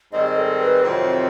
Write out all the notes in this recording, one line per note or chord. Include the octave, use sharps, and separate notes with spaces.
G#2 D#3 G3 C4 D#5
D#5
A4
B4
F2 C3 D#3 F#3 C5